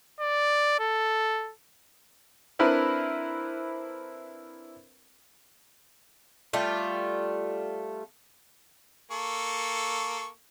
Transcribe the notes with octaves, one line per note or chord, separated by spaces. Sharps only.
D5
A4
C4 D4 E4 A#4 B4
G3 A3 F4
A#3 A4 C#6